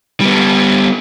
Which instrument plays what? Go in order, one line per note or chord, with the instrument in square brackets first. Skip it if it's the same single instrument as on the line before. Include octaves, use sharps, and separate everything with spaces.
[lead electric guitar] G3 B3